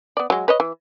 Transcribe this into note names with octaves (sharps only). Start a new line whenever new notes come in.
B3 D5
F#3 G#3
B4 C#5 D#5
E3